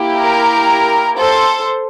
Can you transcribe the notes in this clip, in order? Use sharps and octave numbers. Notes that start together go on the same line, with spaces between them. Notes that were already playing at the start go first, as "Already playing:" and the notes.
Already playing: A#3 E4 G4
A#4
A4 C5